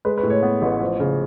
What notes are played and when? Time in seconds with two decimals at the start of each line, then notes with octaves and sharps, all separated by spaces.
0.05 G#3 B4
0.18 B4
0.23 A2
0.30 C#5
0.43 B3
0.62 A1
0.81 F3
1.00 C#3